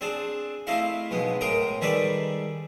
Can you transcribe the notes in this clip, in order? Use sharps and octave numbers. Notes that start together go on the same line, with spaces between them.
C4 D4 G#4 A5
A3 C4 E4 F4 D#5 F5
B1 G#3 B3
A2 G#3 A#4 G5 A#5 D#6
D#3 G3 G#4 A4 B4 D5